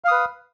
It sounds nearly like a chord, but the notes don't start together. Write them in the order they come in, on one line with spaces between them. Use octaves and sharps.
F5 D#6 B4